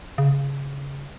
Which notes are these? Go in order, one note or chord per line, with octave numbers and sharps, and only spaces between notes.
C#3